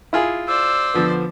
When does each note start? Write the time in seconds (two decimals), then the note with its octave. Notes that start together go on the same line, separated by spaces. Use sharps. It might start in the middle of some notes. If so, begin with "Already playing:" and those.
0.13 E4 F4 G#4
0.47 C5 D5 E6
0.94 D3 F3 B3